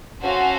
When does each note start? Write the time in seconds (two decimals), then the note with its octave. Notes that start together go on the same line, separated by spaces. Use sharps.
0.22 C#4 F#4 A4 C5 F5